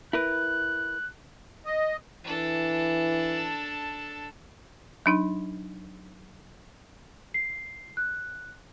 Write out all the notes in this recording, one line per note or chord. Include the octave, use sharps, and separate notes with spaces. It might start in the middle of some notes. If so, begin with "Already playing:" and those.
E4 A#4 B4 F#6
D#5
E3 D4 A4
F#3 D4 D#4
C7
F#6